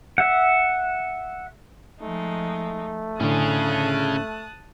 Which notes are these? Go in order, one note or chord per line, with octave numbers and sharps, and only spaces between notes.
E5 F#5
F3 G#3 A3 D#4
A2 D3 C#4 G#4 A5 D#6 F#6